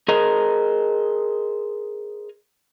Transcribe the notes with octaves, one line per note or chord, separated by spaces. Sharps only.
G#4 A#4 C5 D#5 A#5